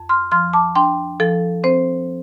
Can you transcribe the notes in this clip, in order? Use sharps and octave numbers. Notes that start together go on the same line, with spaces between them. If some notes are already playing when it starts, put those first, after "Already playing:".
Already playing: F2
C6 F6
F3 C6 F6
A5 D6
D4 G5 C6
F3 A4
C4 C5